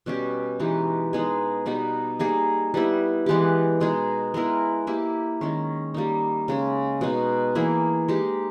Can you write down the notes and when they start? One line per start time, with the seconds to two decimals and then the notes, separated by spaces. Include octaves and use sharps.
0.06 B2 G3 C#4 G4
0.60 E3 G#3 D#4 G4
1.13 G#3 B3 D#4 G#4
1.66 B2 G3 B3 D#4
2.19 G3 A#3 D#4 G#4
2.74 G3 B3 E4
3.26 E3 G#3 B3 G4
3.80 B2 G#3 D#4 G#4
4.34 G#3 B3 E4 A#4
4.87 A#3 E4 G4
5.41 D#3 G#3 C#4
5.94 G3 A#3 D#4
6.48 C#3 G#3 C#4
7.01 B2 G#3 D#4
7.55 E3 A#3 E4 G#4
8.08 G#3 D#4 G4